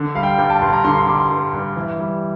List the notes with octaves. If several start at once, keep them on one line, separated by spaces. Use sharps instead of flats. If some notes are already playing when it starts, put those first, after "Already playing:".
Already playing: D3
G3 F5
G5
G2 G5
A5
G2 C6
A#5
D3 C6
C6
G3 D6
C6
G2
G2
E3
G3